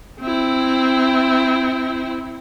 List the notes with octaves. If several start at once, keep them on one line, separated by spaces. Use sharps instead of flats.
C4 E4